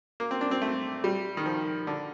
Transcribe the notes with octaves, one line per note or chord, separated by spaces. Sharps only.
A#3
C4
D4
C4
A3
G3
D#3
F3
D3